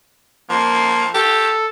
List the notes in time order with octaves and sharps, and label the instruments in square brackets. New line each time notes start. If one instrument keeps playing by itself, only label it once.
[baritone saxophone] F3 [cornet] A#3
[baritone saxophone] G4 [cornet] A4